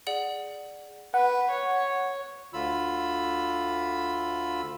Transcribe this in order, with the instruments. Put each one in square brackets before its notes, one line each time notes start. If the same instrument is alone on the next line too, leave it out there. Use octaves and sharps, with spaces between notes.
[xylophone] G#4 D5 F#5 F#7
[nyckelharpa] B4 [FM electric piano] F#5
[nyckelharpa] C#5
[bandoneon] D2 D3 F4 B5 E6